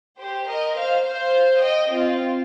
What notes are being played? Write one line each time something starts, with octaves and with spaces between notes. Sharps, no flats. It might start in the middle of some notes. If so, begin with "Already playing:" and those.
G4 C5
A#4 D#5
C5 F5
C5 F5
D#5 G5
C4 F4